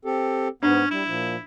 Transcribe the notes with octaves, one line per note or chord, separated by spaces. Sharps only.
C4 G4 A4
G#2 B3 C#4 D4
G3 E4
A#2 F3